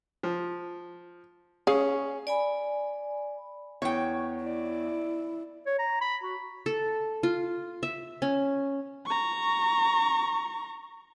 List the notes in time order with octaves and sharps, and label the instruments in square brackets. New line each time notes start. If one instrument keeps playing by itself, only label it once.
[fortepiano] F3
[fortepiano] C#4 [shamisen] G#4 F5
[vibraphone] D5 G#5 B5
[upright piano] E2 [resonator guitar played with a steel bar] C#5 G5
[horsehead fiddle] E4 [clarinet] D5
[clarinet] C#5
A#5
B5
F#4
[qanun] A4
F4
E5
C#4
[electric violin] A#5 C#6